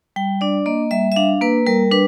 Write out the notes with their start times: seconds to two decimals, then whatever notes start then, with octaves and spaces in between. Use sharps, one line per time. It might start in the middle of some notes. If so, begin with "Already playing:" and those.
0.16 G3 G5
0.41 D4 D5
0.66 A#3 D#5
0.91 G3 E5
1.12 E5
1.16 D4 F5
1.41 A#3 B4
1.67 G3 A#4
1.91 D4 B4